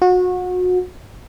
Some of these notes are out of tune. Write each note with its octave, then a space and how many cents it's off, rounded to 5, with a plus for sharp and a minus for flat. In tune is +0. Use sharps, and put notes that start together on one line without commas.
F#4 -30